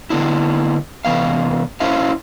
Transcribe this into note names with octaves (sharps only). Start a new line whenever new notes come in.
D3 B3 D4 E4
C3 E3 B3 F5
C#4 E4 C5 E5 F5